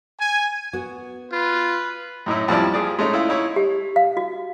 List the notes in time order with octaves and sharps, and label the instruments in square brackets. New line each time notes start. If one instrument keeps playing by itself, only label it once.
[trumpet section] G#5
[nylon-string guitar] B3 F#4
[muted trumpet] F4 [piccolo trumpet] B4
[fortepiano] F#2 A2 D#4 E4
F2 F3 G3 E4 D5
F3 G#4 D5
G#3 A3 C#4 D#4
E4 F4
D#4 E4 C#5
[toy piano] G4
F5
F#4